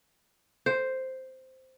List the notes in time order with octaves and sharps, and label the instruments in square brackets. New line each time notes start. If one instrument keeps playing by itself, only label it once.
[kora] C5